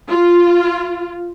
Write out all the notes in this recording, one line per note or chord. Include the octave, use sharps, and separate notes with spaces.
F4